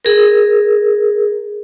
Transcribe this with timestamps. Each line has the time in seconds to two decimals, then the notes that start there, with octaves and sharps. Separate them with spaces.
0.05 G#4 A#4